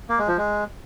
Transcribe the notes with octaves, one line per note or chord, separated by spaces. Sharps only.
A#3
G#3
F3
G#3